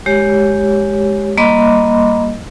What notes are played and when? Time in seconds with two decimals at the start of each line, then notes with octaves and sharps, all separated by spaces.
0.06 G#3 G4 C#5
1.37 G3 A#3 D#5 B5 C6 D6